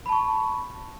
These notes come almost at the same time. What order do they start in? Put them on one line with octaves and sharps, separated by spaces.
B5 A5 C#6